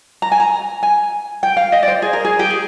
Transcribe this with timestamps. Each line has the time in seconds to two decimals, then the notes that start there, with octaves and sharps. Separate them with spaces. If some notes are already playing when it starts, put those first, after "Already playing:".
0.22 A#5
0.32 G#5
0.40 A#5
0.83 G#5
1.43 G5
1.57 F5
1.72 D#5
1.83 D5
1.88 C5
2.02 G#4
2.13 A#4
2.25 G#4
2.39 G4
2.50 G#4